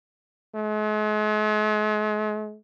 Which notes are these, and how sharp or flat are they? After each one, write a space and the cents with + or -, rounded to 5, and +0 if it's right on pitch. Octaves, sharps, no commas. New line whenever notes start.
G#3 +40